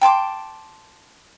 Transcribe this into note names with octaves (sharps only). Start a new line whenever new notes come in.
G5 A5 C6 D6